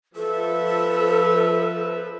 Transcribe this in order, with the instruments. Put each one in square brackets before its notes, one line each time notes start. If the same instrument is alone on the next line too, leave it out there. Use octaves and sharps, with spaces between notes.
[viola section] F3 B4 E5 [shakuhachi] A4